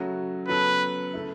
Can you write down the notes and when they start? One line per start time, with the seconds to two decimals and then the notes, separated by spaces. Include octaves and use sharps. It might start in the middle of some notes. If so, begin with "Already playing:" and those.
Already playing: C#3 F#3 A3 F#4
0.48 C#3 F#3 B3 A4 B4
1.13 C#3 A3 E4